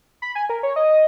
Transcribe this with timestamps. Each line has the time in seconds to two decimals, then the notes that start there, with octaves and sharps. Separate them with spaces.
0.22 B5
0.35 G#5
0.49 A#4
0.63 C#5
0.76 D#5